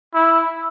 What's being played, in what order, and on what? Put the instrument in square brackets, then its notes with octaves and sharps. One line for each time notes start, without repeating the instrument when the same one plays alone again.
[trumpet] E4